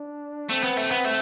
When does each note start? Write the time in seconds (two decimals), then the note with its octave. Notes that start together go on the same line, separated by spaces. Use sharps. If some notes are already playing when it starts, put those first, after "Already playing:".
Already playing: D4
0.50 A3 C4
0.64 B3
0.78 A3
0.92 B3
1.05 A3